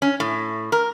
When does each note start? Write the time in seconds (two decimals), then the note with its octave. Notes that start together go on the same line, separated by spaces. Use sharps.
0.02 C#4
0.20 A2
0.72 A#4